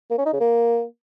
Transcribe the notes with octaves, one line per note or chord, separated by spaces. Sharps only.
A#3
C#4
D#4
C#3
A#3